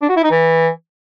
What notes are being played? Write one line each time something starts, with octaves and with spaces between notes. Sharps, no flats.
D4
F#4
E4
D#4
E3